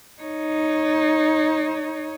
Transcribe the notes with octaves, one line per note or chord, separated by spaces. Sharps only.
D#4 C#5